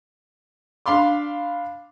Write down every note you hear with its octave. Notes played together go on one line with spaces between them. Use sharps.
D4 F5 B5 C6 D6